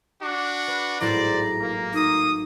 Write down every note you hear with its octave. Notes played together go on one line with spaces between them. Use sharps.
D4 F#4
B4
G#1 A2 F#3 E4 C5 D5 A#5
A#3
A#3 D#4 D#6